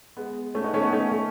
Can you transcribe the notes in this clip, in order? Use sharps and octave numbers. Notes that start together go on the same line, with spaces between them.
G#3 B3
A3 C#4
B3 D#4
A3 C#4
B3 D#4
A3 C#4
A3 C#4